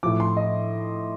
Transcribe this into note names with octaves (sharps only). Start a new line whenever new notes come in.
A2 F3 D6
C6
D#5